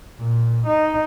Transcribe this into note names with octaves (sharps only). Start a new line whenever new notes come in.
A#2
D#4